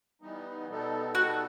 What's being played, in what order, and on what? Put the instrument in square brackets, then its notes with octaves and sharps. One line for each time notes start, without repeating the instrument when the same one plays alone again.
[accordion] E3 G3 B3 D#4
B2 G3 B3 D#4 A4
[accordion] B2 G3 B3 D#4 A4 [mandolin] F#4